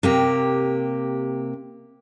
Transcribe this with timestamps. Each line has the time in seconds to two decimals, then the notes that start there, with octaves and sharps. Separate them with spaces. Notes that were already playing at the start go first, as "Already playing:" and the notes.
0.03 C3 A#3 G4